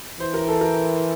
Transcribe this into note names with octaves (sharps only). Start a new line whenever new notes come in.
E3 C5
A#4
A4
A#4